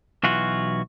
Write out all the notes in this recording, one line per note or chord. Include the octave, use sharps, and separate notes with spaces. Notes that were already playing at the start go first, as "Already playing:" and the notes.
B1 E3 F4 F#4